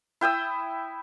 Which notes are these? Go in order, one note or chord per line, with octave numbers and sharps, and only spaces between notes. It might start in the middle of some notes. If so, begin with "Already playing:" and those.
E4 G5 D#6 E6